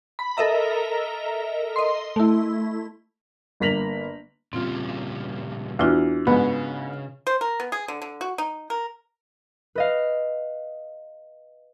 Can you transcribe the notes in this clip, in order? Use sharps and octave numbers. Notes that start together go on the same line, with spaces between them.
B5
A4 A#4 D#5 E5 A#5
D#5 C6
A3 E4
G1 A#3 A#6 B6 F7 F#7
A#2 C#3 G3 C4 F4
E2 D4 F4 F#4
G#2 C#3 B3 B5
C5
A#4
B3
G#4
D3
D3
F#4
D#4
A#4
B4 D#5 F5